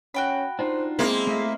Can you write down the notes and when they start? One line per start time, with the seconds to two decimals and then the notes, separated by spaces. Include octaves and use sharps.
0.14 C#4 F#4 G5 B5
0.59 D4 D#4 F4 C5
0.99 G#3 A#3 C4 E4
1.27 A3 D#5 E5